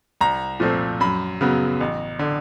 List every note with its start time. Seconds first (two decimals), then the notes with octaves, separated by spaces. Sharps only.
0.21 C2 A#5
0.60 A#2 F3 A3 C4
1.00 F#2 B5
1.41 C#3 F#3 B3
1.81 A1
2.19 D3